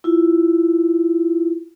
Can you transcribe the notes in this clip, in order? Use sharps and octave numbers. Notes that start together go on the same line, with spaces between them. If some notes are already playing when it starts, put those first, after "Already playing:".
E4 F4